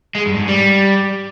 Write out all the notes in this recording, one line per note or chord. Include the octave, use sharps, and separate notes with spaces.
G#3
G2
G#2
G3